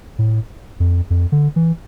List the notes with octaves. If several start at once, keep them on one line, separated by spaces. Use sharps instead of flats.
A2
F2
F2
D3
E3